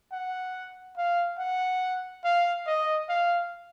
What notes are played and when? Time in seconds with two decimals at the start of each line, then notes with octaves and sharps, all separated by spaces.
0.12 F#5
0.97 F5
1.39 F#5
2.24 F5
2.67 D#5
3.09 F5